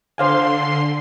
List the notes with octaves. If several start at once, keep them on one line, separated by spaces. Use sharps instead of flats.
D3 C5 F5 G#5 C6